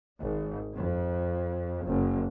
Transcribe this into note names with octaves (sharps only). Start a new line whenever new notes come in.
G#1
F2
F#1